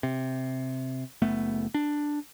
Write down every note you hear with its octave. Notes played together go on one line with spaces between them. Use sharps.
C3
F#1 A3 B3
D4